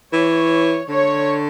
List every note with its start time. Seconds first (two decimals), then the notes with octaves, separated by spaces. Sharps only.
0.13 E3 C#5
0.89 D3 C#5